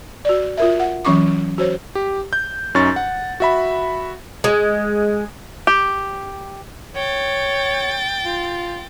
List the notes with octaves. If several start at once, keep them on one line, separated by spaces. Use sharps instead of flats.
F#4 D5
F4 A#4 E5
F#5
E3 F#3 C#4 C#6 D6
F#4 C5 C#5
G4
G6
F#2 C#4 D#4 C#6 A6
F#5
F#4 E5 B5
G#3
G4
C#5 G5 A6
F4